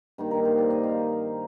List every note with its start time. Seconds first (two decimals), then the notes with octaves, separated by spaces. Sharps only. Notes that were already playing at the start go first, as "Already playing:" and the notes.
0.18 G2 D#3 A#3
0.31 A#4
0.45 C5
0.58 D5
0.70 D#5
0.84 F5